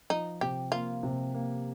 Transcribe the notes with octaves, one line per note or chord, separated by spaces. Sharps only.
F3 D#4
C3 G4
A#3 F4
C3
A#3